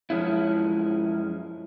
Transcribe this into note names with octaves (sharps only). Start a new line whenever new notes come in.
F#2 F3 G#3 C#4 E4